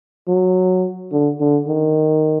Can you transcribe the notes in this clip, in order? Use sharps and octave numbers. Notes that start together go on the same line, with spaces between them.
F#3
D3
D3
D#3